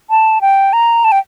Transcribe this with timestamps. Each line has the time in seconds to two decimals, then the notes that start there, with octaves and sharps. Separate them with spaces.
0.10 A5
0.41 G5
0.73 A#5
1.04 A5
1.12 G5